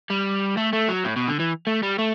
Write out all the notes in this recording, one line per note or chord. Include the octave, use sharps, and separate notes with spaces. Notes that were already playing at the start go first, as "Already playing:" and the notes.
G3
A3
A3
F#3
A2
B2
D3
E3
A3
G3
A3